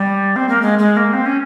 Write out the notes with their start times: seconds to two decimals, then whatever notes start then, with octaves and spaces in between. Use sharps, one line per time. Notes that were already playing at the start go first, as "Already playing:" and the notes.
Already playing: G3
0.36 C4
0.49 A#3
0.62 G#3
0.79 G#3
0.97 A#3
1.13 C4
1.26 C#4